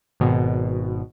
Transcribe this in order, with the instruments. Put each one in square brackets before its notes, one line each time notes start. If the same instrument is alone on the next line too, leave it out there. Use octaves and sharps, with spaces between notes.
[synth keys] G#1 B2